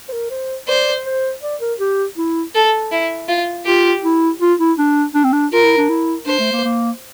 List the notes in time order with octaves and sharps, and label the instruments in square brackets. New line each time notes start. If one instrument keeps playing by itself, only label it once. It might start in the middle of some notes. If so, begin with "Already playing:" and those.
[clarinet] C5
A#4
C5
[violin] C5 [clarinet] D5
[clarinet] C5
D5
A#4
G4
E4
[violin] A4
E4
F4
[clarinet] F4 [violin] G4
[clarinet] E4
F4
E4
D4
D4
C4
D4
[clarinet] F4 [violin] A#4
[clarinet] E4
D4
E4
[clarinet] D4 [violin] C5
[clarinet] A3
A#3
A#3